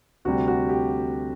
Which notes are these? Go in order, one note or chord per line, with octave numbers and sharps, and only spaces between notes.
D2 C3 G3 F#4
F#4
G4